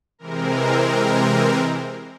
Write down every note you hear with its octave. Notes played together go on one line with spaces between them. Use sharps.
C3 E3 G#3 C4 A#4